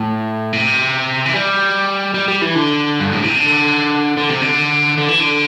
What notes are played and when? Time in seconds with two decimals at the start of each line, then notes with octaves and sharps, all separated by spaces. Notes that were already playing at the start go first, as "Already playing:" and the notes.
Already playing: A2
0.53 C3
1.26 E3
1.34 G3
2.14 G3
2.28 G3
2.42 E3
2.55 D3
3.00 G2
3.12 A2
3.24 C3
3.36 D3
4.17 D3
4.29 C3
4.42 D3
4.98 D3
5.08 E3
5.20 D3